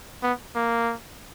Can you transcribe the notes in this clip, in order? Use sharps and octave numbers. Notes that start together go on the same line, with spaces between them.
B3
A#3